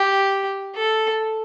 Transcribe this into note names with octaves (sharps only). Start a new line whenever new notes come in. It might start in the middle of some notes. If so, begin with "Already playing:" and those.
Already playing: G4
A4